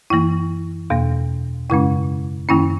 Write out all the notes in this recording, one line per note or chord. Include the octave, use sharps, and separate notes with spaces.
F#2 E3 A#3 E4
E2 B2 A#3
F#2 C#3 G#3 C#4 E4
F#2 D#3 A#3 C#4 E4